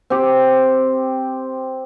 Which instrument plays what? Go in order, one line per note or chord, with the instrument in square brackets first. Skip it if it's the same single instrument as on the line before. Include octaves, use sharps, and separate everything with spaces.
[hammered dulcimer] C4 G4